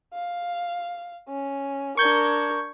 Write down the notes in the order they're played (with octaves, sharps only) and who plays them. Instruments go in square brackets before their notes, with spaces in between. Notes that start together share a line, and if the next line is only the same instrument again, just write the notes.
[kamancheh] F5
C#4
[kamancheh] D4 A#4 [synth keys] C#6 G6 G#6